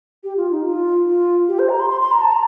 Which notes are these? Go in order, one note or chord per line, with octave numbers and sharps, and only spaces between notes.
G4
F4
D#4
F4
F4
G4
C5
A#5
C6
C6
C6
A#5
A5
A#5